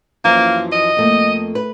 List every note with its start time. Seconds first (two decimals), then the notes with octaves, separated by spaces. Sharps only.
0.25 F#2 E3 F3 A#3
0.72 D#5
0.97 F2 A3 A#3
1.55 B4